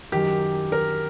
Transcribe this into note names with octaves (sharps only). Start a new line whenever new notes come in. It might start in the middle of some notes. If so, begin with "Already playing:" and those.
F#2 D#3 G4
A#4